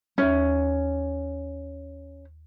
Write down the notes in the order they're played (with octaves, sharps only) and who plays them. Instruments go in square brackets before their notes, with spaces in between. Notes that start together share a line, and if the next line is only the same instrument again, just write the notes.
[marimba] D#2 E5 F6 [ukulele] C#4